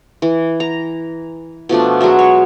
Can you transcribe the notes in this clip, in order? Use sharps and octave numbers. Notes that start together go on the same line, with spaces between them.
E3
A#5
B2 F3 A3 D4
F#3 G#3 F#4 E5
C#5